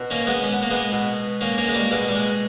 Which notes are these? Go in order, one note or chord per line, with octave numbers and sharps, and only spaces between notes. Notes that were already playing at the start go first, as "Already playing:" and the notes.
Already playing: B2
A#3 C#4
G#3 B3
C#4
B3
A#3
G#3 B3
B2
A#3 C#4
A#3 C#4
G#3
G3 A#3
B2 G#3
G3
G#3